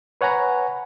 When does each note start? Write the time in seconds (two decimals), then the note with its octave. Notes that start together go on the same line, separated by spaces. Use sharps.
0.21 B4 C#5 F#5 G#5 A#5 B5